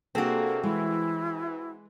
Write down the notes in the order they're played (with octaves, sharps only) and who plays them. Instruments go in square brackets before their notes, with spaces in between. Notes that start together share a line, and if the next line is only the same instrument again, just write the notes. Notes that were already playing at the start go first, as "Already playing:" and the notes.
[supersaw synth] C3 A#3 [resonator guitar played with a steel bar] C4 F#4 [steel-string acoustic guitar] D4 G#4 A4
[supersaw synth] E3 [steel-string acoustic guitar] G#3 [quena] E4